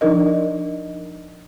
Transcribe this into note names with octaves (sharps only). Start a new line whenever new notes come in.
F3 D4 D#4 A#4 D#5